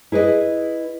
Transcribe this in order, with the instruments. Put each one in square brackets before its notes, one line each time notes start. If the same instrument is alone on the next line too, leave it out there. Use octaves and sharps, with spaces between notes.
[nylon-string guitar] E4 G#4 B4 C#5 D#5